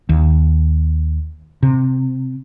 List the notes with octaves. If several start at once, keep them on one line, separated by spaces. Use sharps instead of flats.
D#2
C3